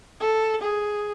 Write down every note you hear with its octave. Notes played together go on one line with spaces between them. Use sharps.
A4
G#4